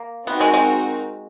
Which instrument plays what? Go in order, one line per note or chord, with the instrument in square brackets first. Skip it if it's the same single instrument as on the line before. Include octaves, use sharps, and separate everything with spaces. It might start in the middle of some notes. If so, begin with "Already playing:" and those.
Already playing: [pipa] A#3
[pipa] B3 [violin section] C4 D#4 F#4 A#4
[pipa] G#3
G#3